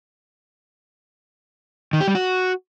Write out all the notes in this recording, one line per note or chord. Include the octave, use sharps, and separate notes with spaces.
D#3
G4
G3
F#4